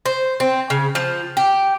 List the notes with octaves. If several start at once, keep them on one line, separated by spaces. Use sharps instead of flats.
C5
C4
C#3
F3
G4